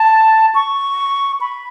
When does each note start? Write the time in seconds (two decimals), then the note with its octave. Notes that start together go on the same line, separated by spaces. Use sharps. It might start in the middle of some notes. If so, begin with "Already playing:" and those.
Already playing: A5
0.55 C#6
1.41 B5